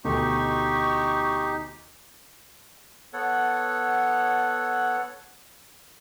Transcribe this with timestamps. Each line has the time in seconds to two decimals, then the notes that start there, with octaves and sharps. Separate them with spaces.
0.04 D2 B2 D#4 G4 C#6
3.13 B3 A4 C#5 F#5